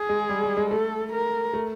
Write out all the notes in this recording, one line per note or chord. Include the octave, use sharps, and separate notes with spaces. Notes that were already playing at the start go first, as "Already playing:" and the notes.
Already playing: G#4
G#3
G3
G3
G#3
A3 A4
A#4
A3